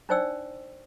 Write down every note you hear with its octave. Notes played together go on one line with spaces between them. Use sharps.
D4 D#4 C5 D5 G5 E6